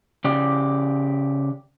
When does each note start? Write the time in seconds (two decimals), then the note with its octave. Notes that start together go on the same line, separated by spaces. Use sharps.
0.25 C#3 G4 D5